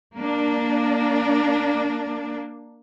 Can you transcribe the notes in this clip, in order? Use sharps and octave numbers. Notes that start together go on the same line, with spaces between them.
A#3 D4